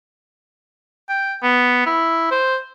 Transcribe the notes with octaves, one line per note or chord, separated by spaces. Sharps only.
G5
B3
E4
C5